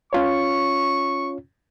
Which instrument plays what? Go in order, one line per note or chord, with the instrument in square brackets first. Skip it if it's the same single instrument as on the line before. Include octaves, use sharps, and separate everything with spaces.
[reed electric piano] C#4 F4 C#5 [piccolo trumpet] C#6